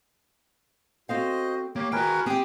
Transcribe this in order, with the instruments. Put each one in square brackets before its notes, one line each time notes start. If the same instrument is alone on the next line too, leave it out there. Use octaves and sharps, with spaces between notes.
[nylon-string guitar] C4 A4 F5 [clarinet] F#4 [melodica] C5 D#5
[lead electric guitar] A#3 [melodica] G4 [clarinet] C#5
[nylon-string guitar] D#3 [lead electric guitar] F#4 G5 [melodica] A#4 B4 [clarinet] G#5
[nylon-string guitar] C4 G5 [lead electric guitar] G4 [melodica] D#6